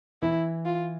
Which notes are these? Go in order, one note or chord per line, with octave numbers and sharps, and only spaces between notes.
E3 E4
F4